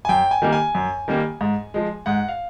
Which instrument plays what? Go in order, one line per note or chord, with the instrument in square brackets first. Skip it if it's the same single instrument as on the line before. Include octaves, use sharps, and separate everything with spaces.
[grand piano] G#5
F#2 G5
G#5
D#3 G3 A#3
G#5
F#2
D#3 G3 A#3
G#2
F3 G#3
G#2 F#5
F5